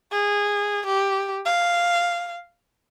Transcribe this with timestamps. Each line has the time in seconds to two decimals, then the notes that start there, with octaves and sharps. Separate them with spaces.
0.12 G#4
0.86 G4
1.45 F5